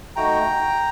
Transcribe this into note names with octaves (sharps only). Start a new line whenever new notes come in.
A3 D#4 F#4 G5 A#5